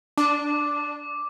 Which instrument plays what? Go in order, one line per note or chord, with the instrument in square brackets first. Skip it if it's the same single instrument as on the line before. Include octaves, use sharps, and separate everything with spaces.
[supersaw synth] D4 [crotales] D6